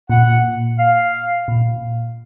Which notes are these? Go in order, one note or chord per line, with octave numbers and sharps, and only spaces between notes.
A#2 F#5
F5
A#2